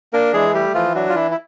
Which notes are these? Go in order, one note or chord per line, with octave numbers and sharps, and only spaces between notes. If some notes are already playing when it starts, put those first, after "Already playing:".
A#3 D4 A#4
E3 G#3 G#4
G3 A3 G4
E3 F3 F4
F#3 D4 F#4
F4
E3 E4
E4